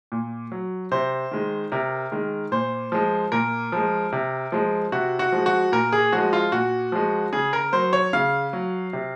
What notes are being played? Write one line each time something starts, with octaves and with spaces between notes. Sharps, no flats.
A#2
F#3
C3 C5
D#3 G#3
C3 A#4
D#3 G#3
A#2 C5
F3 G#3
A#2 A#4
F3 G#3
C3
F3 G#3
C3 F#4
F#4
F3 G#3
F#4
A#2 A#4
G#4
F3 G#3 F#4
F4
A#2 F#4
F3 G#3
C#3 G#4
A#4
F#3 C5
C#5
C#3 F5
F#3
C3